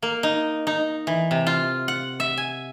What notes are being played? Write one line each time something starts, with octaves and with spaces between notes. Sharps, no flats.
A#3
D#4
D#4
E3
C3
F4
F#5
E5
G#5